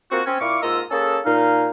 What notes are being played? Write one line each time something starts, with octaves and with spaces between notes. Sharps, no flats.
A#3 C4 F4 F#4
C4 C#4
A#2 E4 F5 C#6 D6
G#2 A#3 F4 D#5 A#5 E6
A#3 C#4 G#4 A4
A#2 D#4 F5